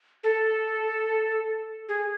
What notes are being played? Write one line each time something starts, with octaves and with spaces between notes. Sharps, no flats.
A4
G#4